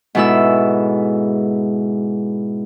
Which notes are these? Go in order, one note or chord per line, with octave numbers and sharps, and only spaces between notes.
G#2 B2 G#3 E4 A4 E6